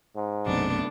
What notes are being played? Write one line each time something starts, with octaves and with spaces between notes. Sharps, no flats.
G#2
B1 F#2 C3 A3 B3 D4